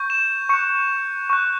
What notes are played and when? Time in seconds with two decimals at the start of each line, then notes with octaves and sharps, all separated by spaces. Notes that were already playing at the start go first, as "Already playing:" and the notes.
Already playing: C#6 G6
0.10 E7
0.49 C#6 F#6 C#7
1.30 C#6 F#6